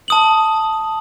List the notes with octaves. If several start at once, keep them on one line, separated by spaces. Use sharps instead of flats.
A5 D#6 F#7